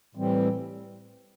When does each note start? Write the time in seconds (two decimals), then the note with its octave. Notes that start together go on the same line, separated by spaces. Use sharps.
0.15 A2 E3 G3 C4